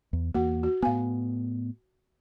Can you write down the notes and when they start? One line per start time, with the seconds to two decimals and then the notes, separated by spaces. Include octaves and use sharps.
0.13 E2
0.34 E2 A#3 F#4 F#5
0.63 F#4
0.83 A2 B3 F5 G#5